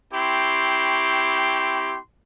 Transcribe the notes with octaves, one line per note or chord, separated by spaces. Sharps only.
C4 E4 G4 C6 C#6